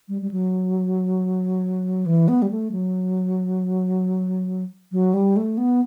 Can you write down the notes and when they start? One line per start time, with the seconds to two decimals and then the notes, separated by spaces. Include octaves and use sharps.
0.08 G3
0.22 G3
0.31 F#3
2.06 E3
2.28 B3
2.42 G3
2.51 A3
2.72 F#3
4.92 F#3
5.14 G3
5.36 A3
5.58 B3